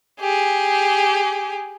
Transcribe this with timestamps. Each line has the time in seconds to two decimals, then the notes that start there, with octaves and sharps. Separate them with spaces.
0.20 G4 G#4